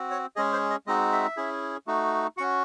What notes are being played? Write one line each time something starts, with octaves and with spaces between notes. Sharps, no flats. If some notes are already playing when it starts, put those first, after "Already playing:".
Already playing: C4 F#4
C#5
G#3 C#4 G#4 D#5
C5
D#5
G#3 C4 D#4 F#4 D#5
E5
C#4 E4 G#4
A3 D#4 F#4
C#4 F#4 F#5